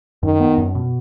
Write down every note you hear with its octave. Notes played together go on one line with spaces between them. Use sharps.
F#2 D#3
B3
F#2
B2